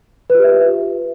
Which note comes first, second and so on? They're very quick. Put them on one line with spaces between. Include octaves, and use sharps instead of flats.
B4 F4 G4 E5